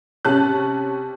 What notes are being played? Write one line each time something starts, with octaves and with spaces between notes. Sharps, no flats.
C3 C#4 A5 F#6